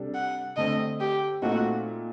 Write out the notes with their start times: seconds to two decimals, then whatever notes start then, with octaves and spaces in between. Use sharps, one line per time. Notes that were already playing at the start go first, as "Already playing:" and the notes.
Already playing: C3 G3 D4 A4
0.14 F#5
0.57 D3 A3 C4 D#5
1.00 G4
1.42 A#2 A3 C4 D#4 F#4